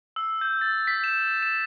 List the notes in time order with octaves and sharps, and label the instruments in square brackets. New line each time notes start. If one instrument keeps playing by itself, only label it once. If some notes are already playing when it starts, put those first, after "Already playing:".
[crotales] E6
G6
A6
B6
E7
E7